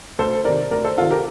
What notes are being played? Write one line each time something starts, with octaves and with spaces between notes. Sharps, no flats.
D2 A4 C5
C3 D#3 A#4 D5
D2 A#4 D5
A4 C5
C3 D#3 F4 A4
G4 A#4